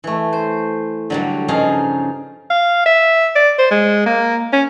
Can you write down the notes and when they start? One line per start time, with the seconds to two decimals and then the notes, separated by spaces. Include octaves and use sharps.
0.04 E3 A3
0.33 C5
1.10 D3 F#3 G3
1.48 G2 C#3 F3 D#4 G#4 F5
2.50 F5
2.86 E5
3.35 D5
3.59 C5
3.71 G#3
4.06 A#3
4.53 C#4